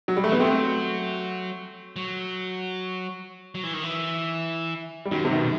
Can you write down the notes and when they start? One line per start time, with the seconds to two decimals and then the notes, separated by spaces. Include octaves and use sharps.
0.08 F#3
0.17 G3
0.24 A3
0.29 E3 B3
0.39 F#3 A3 C4
1.96 F#3
3.55 F#3
3.63 E3
3.73 D#3
3.83 E3
5.05 G3
5.11 F#2 D#3 F#3
5.25 C3
5.31 B2 D#3